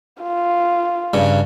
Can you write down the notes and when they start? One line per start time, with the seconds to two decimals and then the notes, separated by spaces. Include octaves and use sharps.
0.22 F4
1.14 G2 C#3